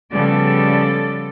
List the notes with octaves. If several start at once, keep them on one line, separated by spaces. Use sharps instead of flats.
C#3 F3 G3 B3 A4 D5